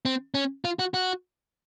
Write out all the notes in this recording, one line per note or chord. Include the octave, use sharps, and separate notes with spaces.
C4
C#4
F4
F#4
F#4